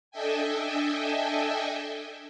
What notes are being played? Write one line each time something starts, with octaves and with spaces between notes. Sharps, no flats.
D4 A4 D#5 E5 G5 G#5